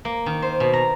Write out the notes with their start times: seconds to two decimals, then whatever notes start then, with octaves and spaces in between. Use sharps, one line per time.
0.05 A#3
0.26 D#3
0.42 C5
0.60 B2
0.73 A#5